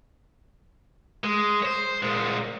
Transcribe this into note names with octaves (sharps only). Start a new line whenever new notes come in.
G#3
C5 C#5
A#2 G#3